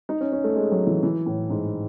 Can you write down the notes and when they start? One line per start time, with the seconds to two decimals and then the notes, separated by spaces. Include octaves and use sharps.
0.09 D#4
0.20 C#4
0.32 C#4
0.44 A3
0.56 G#3
0.71 F#3
0.87 E3
1.03 E3
1.26 A2
1.50 G#2